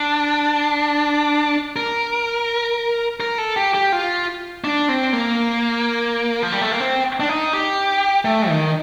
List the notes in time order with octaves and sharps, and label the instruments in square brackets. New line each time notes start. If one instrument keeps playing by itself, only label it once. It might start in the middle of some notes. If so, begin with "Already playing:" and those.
Already playing: [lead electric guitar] D4
A#4
A#4
A4
G4
G4
F4
D4
C4
A#3
F3
G3
A3
A#3
C4
D4
D#4
G4
A3
D#3